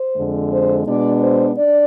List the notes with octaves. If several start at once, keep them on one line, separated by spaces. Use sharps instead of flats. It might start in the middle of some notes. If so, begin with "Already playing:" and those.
Already playing: C5
F2 D3 G#3
C5
B2 G#3 B3 D4 D5
C5
D4 D5